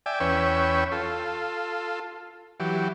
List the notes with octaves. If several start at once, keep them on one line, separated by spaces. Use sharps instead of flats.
D5 E5 G5 G#5
E2 C#4 B4 C#5 G5 E6
F4 A4
E3 F#3 G4